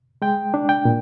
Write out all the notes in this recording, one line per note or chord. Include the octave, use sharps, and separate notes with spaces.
G#3 G5
D4
G5
A#2